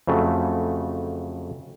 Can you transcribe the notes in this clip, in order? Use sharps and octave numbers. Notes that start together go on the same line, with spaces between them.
F2 C#3 F#3 A3